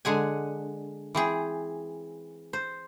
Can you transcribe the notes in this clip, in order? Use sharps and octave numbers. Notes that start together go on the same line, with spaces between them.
D3 G#3 F#5 G#5
E3 C4 G#4
C5